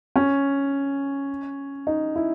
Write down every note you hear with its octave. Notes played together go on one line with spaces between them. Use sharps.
C#4
D#4
E4